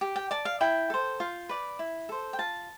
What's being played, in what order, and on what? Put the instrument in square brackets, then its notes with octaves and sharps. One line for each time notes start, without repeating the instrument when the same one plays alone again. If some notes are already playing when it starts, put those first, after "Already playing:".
[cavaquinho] G4
G5
D5 A5
F5
E4 G5
A4 C5
F4
B4 D5
E4
A4 C5
G5
F4 A5